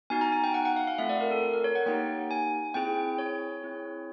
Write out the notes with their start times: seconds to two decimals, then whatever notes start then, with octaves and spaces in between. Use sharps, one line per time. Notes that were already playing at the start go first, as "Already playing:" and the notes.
0.10 B3 D#4 F#4 G#5
0.21 A#5
0.32 G#5
0.44 G5
0.54 F#5
0.65 F#5
0.76 F5
0.87 F5
0.98 A3 C4 F4 A4 E5
1.09 D5
1.21 A#4
1.31 A4
1.53 A#4
1.64 C#5
1.75 F#5
1.86 A#3 D#4 G4 G5
2.31 G#5
2.74 C4 E4 G#4 G5
3.19 C#5
3.63 C4 E4 G#4